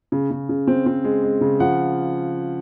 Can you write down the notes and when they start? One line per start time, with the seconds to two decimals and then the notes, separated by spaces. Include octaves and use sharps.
0.12 C#3
0.31 C#3
0.49 C#3
0.67 C4
0.86 C4
1.04 G#3
1.23 G#3
1.41 C#3
1.60 F3 F#5